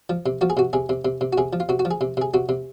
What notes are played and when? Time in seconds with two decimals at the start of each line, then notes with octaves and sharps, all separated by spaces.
0.10 F3
0.26 C3
0.41 F3 F#4
0.50 G#4
0.57 C3 F#4
0.73 C3 G#4
0.89 C3
1.05 C3
1.21 C3
1.33 F#4
1.38 C3 G#4
1.53 F3
1.60 F4
1.69 C3 F#4
1.79 F#4
1.85 F3
1.91 G#4
2.01 C3
2.17 C3 G#4
2.34 C3 F#4
2.49 C3